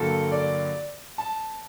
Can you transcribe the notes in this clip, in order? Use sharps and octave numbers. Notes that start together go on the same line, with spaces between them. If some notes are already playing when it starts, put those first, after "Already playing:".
Already playing: G2 D3 F#3 A#3 A4
D5
A5